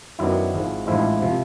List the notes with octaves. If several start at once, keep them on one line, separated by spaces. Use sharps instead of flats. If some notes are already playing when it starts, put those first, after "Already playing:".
F#2 D#3 F#3 B3 D4 E4
G#1 G#2 F3
A1 G#2 F3 G#3 E4
C3 F3